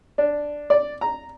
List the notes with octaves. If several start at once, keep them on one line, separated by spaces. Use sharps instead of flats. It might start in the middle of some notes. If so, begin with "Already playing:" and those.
D4
D5
A#5